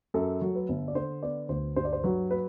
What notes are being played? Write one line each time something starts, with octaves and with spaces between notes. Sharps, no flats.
F#2 A4
F#3
B4
G1
D5
D3 C5
B3 D5
D2 C5
G2 C5
D5
C5
F#3 B4
B4